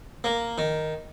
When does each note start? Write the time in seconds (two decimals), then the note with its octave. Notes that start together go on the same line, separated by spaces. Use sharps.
0.24 A#3
0.58 D#3